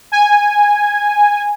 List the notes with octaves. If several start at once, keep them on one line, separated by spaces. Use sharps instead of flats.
G#5